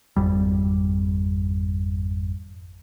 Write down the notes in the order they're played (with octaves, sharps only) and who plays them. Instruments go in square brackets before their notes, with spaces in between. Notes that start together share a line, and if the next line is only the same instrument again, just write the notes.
[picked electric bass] G#1 F2 G3